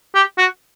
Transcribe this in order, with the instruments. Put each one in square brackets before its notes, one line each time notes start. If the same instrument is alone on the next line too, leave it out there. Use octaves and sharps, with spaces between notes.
[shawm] G4
F#4